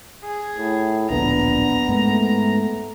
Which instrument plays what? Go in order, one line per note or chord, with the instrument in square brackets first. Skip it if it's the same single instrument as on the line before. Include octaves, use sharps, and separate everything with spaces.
[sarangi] G#4
[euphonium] A2
[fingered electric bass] D1 A#1 A#2 [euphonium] B3 [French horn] D4 [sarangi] A#5
[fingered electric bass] G#2 A#3 [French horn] A3